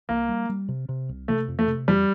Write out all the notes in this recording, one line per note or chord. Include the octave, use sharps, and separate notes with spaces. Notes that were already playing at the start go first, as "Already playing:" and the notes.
C2 A#3
G3
G3
C3
C3
C2
C3 A3
F2
A3
C3
F2 G3